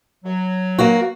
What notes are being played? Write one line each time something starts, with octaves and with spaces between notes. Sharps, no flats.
F#3
A#3 F#4